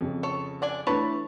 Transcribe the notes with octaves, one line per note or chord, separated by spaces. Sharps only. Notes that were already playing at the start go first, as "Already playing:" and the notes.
F2 C#3
A4 C#5
D4 D5 G#5
E3 A3 D4 B4 C#5 A5